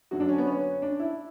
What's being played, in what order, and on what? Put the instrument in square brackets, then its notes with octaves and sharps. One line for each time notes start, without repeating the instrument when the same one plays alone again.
[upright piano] F#2 D3 F#3 F#4
D4
C#4
B3
C#4
D4
E4